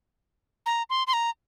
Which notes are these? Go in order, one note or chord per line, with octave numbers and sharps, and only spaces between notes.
A#5
C6
C6
A#5